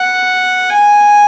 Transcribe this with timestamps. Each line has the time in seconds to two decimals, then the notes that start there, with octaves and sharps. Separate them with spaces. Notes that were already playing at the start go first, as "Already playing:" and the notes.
Already playing: F#5
0.70 G#5